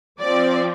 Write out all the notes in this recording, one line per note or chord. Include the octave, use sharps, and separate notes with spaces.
F3 C4 D5